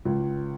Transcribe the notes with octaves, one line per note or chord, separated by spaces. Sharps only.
C#2